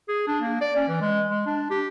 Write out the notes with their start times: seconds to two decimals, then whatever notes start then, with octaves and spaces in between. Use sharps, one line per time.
0.08 G#4
0.27 D4
0.41 A#3
0.61 D5
0.76 C#4
0.88 E3
1.01 G#3
1.29 G#3
1.46 D4
1.70 G4